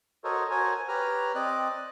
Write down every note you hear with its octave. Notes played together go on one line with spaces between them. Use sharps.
F#4 A4 A#4 C5 C#5 D#5
F#4 A#4 C5 C#5 G#5
G4 B4 C#5 A#5 F6
C4 D5 D#5 F#6